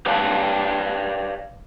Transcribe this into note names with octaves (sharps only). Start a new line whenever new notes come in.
G4 B4 C#5 D5 F5 A5